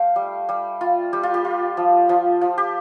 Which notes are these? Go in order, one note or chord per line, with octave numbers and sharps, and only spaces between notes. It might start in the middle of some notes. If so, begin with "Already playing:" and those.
Already playing: A3 F5 G5
G3
G3
F4
G3 G4
F4
G4
F4
F3
F3
F3
G4